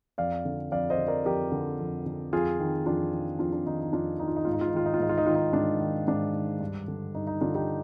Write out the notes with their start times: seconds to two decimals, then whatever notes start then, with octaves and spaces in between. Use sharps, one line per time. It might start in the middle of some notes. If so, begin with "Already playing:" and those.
0.18 F2 D5 F5
0.45 D3
0.72 F2 D5 F5
0.90 C5 D#5
0.98 D3
1.08 A#4 D5
1.25 F2 G4 A#4
1.52 D3
1.79 F2
2.06 D3
2.33 F2 F4 G#4
2.60 D#3
2.86 F2 D4 F4
3.13 D#3
3.39 F2 D4 F4
3.52 D4
3.66 D#3 D#4
3.80 D#4
3.93 F2 D4 F4
4.19 D#3 D#4
4.28 F4
4.36 D#4
4.45 G#2 F4
4.53 D#4
4.61 F4
4.69 D#4
4.74 D#3 F4
4.86 D#4
4.94 F4
5.00 G#2 D#4
5.09 F4
5.18 D#4
5.26 D#3 F4
5.35 D#4
5.53 G#2 D4
5.81 D#3
6.07 G#2 D4
6.33 D#3
6.61 G2
6.88 D3
7.15 G2 D#4
7.27 D#4
7.41 D3 D4 F4
7.55 D#4 G4